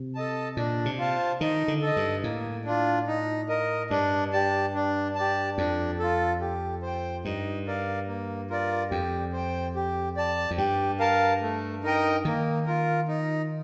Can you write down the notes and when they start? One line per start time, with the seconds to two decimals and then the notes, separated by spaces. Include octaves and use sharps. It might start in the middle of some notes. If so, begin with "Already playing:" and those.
Already playing: C3
0.15 A4 D#5 A5
0.57 A#2 D4
0.85 C3
0.98 F4 C5 F5 A5
1.40 D#3 D#4
1.68 D3
1.82 A4
1.87 D#5
1.96 G2
2.24 A2 A#3
2.65 D4 F4
3.07 D#4
3.49 A#4 D#5
3.90 G2 D4
4.32 G4 D5 A5
4.74 D4
5.15 G4 D5 A5
5.58 F2 D4
5.99 F4 A4
6.41 G4
6.82 C5 G5
7.25 G2 D#4
7.67 A#4 D5 F5
8.08 A#3
8.50 F4 A#4 D5
8.91 F2 G4
9.33 C5 G5
9.75 G4
10.17 D5 A5
10.51 F2
10.58 G2 G4
11.00 A#4 F5 A5
11.42 A3
11.83 D#4 A#4 D#5 G5
12.25 D#3 A#3
12.66 F4 A#4
13.08 D#4